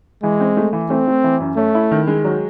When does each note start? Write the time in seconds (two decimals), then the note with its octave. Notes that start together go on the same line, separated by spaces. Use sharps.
0.23 E3 G#3
0.40 C4
0.57 A3
0.73 E3
0.90 A3 C4
1.07 A3
1.24 E3
1.40 F#2
1.57 A3 C#4
1.75 E4
1.91 D#3
2.07 G#3
2.25 F#3